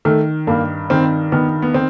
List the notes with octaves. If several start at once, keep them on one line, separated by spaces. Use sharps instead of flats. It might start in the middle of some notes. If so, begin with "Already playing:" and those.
D#3 A3
G2 A#3
D#3 C4
D#3 B3
B3
D#3 C4